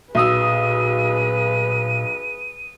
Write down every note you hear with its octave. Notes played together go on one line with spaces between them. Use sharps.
B1 A#2 G#4 B4 D#6 E6 D#7